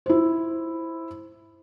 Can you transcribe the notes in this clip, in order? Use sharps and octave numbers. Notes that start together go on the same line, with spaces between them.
E4 C5